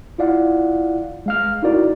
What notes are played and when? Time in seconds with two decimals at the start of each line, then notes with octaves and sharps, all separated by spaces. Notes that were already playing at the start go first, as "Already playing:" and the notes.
0.18 E4 F4 D5 F5 F#5
1.26 G#3 F5 F6
1.63 D#4 E4 F#4 A#4 D5